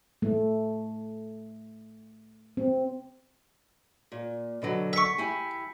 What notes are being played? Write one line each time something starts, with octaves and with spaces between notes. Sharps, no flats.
A3
C4
A#2
B2 D3 F#3
E5 C#6 B6 C#7
E4 G4 G#5